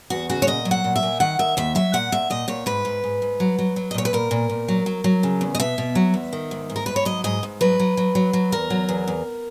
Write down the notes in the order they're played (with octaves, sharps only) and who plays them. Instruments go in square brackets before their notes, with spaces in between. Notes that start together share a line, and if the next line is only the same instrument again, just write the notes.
[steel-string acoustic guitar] E2 F#4
C#3 F#4
C#5
A#2 D#5
F#3
F#5
A#2
E5
A#2
D#3 F#5
D#3 E5
D#2 E5
F#3 E5
A#2 F#5
A#2 E5
A#2 D#5
A#2 C#5
G#2 B4
G#2
G#2
G#2
F#3
F#3
F#3
D#5
A#2 C#5
B4
A#2 A#4
A#2
A#2
F#3
F#3
F#3
C#3
E2
D#5
B2 E5
B2
F#3
E2
D#3
G#2
G#2
A#4
G#2 B4
C#5
F#3 D#5
G#2 D#5
G#2
F#3 B4
F#3
F#3
F#3
F#3
E2 A#4
F#3
E2
E2